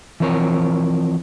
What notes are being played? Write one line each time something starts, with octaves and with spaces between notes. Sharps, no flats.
E3 F3 C4 A#4 C#5